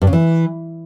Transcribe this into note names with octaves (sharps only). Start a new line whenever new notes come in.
G2
C#3
E3